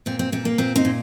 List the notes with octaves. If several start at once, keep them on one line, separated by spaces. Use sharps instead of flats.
A#2 C4
C4
A#2 C4
A#3
A#2 C4
C4 D#4
A#2